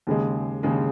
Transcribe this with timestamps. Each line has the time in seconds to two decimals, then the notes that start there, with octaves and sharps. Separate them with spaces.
0.07 D#2 C#3 G#3
0.63 D#2 C#3 G#3